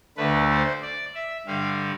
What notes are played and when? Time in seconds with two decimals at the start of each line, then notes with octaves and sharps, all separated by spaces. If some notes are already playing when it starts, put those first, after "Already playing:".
0.17 D2 D3 A3 B4
0.51 C5
0.83 D5
1.15 E5
1.46 G2 D3 G3 F5